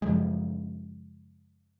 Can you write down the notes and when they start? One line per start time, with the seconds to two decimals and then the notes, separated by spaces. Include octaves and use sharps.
0.02 F#2 C#3 F3 G#3